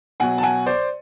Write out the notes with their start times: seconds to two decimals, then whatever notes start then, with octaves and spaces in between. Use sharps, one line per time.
0.20 B2 F#3 F#5 G#5
0.38 A5
0.43 F#5 G#5
0.66 C5 D5